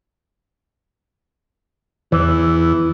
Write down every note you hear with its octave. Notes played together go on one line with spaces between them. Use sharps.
E2 E3